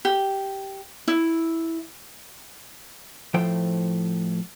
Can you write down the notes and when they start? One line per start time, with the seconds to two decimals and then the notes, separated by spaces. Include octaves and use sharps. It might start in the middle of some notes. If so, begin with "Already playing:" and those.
0.05 G4
1.08 E4
3.34 A2 F3 A3 C5 G5